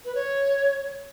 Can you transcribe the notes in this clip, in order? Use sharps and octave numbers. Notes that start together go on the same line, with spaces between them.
B4
C#5